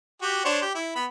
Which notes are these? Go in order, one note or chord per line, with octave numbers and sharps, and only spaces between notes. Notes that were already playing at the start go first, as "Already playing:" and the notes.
F#4 G4
D4 C5 C#5
G4
E4
B3 B5